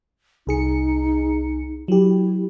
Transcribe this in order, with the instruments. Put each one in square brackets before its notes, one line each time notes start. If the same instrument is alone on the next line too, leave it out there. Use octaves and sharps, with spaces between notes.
[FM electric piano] C2 G#4 C#7 [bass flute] D#4
[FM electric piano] F#3 G4 [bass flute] E4